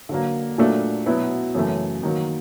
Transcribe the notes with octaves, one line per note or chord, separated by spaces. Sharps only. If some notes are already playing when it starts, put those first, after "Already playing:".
D3 F#3 A#3
A#2 F#3 A3 D4
B2 F#3 B3 E4
F#2 C#3 E3 A3
D#3 F#3 A#3